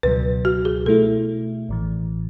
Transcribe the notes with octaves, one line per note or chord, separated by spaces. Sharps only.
C#2 B2 F#3 B4
F#4
G#4
B2 A3 E4 A4
A1 A2 E3